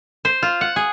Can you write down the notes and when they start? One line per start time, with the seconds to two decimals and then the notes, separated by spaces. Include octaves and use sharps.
0.25 C5
0.43 F4
0.61 F#5
0.76 G#4